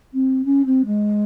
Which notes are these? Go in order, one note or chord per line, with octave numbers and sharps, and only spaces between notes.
C4
C#4
C4
G#3